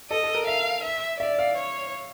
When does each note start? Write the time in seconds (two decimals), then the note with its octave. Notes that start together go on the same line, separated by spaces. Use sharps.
0.10 A4 D#5
0.23 A4
0.35 A#4
0.47 E5 F5
0.84 E5
1.20 D5 E5
1.39 F5
1.57 C#5